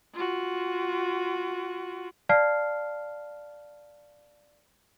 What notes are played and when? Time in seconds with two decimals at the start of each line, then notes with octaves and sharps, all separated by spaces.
0.14 F4 F#4
2.29 D5 F5 A5 F6 C7